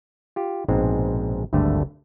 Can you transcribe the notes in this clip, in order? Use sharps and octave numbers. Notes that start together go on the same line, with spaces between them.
F4 G4
A#1 G#2 B2 G#3 C4
G#1 D2 G2 D3 A3